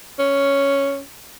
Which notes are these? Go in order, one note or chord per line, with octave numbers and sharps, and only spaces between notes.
C#4